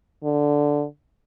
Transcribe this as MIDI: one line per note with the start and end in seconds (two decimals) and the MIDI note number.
0.24 0.85 50